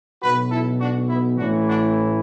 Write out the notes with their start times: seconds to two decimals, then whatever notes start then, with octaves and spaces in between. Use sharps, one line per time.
0.22 B1 B2 F#4 B4
0.51 E4 A4
0.80 D4 F#4
1.09 B3 E4
1.37 A1 A2 E3 D4 F#4
1.67 D4 F#4